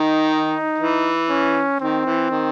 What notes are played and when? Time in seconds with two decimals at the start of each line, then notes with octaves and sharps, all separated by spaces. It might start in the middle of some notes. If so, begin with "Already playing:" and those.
Already playing: D#3 D#4
0.78 E3
1.30 C#4
1.80 D#3 C4
2.06 E3
2.31 D#3